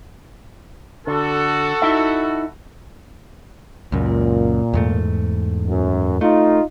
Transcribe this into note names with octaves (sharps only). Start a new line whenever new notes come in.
D3 F#4 A4
D#4 E4 E5
C#2 F#2 A#2
E2 G#2 A3
F#2
A3 D#4 F4